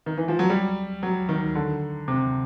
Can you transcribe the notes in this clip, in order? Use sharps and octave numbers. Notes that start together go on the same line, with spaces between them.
D#3
E3
F3
F#3
G3
F#3
D#3
D3
C3